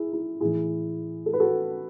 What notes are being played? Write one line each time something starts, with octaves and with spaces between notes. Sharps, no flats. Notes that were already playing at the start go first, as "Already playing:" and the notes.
Already playing: E4 G#4
E4 G#4
A2 E3 E4 G#4
A4
B4
F#4 A4